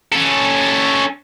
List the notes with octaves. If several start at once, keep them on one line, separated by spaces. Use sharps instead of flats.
C#4 A4